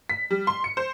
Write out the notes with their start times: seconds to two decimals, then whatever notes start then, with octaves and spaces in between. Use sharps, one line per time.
0.09 B6
0.31 G3
0.47 C6
0.64 C#7
0.77 C5